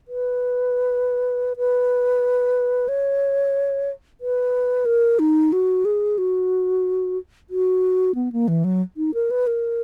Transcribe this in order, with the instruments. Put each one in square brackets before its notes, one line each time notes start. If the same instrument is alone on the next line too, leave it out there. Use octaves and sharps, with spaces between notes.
[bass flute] B4
B4
C#5
B4
A#4
D#4
F#4
G#4
F#4
F#4
B3
A#3
E3
F#3
D#4
A#4
B4
A#4